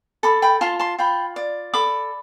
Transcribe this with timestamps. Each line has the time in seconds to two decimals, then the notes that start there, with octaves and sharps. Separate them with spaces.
0.23 A4 B5 D6
0.42 G5 B5
0.61 F4 A5 C6
0.79 A5 C6
0.99 F4 G5 B5
1.36 D5
1.74 A4 B5 D6